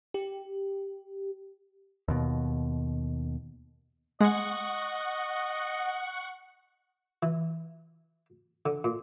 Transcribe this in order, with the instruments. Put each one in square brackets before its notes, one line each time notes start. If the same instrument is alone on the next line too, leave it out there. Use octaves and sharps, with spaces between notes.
[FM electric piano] G4
[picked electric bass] D#2 B2
[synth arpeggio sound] G#3 [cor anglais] D#5 [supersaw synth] F#5 C#6
[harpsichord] E3
D3
A#2